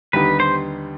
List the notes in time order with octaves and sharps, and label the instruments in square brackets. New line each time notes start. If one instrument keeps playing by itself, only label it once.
[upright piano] D#2 D3 G3 B3 D#4 [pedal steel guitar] B4
[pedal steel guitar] C5